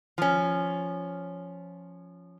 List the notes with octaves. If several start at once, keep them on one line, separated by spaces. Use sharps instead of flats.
F3 C#4